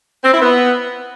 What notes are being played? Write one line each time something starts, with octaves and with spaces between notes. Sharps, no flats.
C4
E4
B3